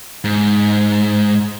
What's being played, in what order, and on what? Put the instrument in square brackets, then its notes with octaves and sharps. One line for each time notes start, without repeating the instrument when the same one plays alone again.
[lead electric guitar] G#2